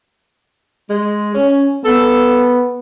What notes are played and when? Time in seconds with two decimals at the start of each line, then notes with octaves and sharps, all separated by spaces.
0.90 G#3
1.34 C#4
1.84 B3 A4